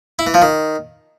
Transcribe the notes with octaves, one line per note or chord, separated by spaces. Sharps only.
E4
E3
F3
D#3